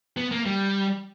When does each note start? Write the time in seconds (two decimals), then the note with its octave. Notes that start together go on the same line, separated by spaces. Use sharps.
0.17 B3
0.31 A#3
0.46 G3